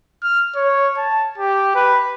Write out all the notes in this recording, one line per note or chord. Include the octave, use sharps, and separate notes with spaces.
F6
C#5
A5
G4
B4